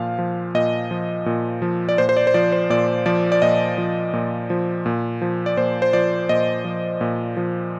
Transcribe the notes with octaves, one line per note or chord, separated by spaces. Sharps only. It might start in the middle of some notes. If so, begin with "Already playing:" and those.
Already playing: A#2 F3 F5
F3
A#2 D#5
F3
A#2
F3
D5
A#2 C5
C5
D5
C5
F3 D5
C5
A#2 D5
F3 D5
D5
A#2 D#5
F3
A#2
F3
A#2
F3
D5
A#2 C5
C5
F3 D5
A#2 D#5
F3
A#2
F3